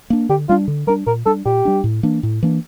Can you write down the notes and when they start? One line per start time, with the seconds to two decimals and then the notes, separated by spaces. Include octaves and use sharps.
0.10 A#3 D4
0.29 D3 G4
0.49 G3 D4 F4
0.68 D3
0.87 G3 D4 A#4
1.07 A#2 A#4
1.26 G3 D4 A4
1.45 A#2 G4
1.65 G3 D4
1.84 A2
2.03 E3 A#3 D4
2.23 A2
2.43 E3 A#3 D4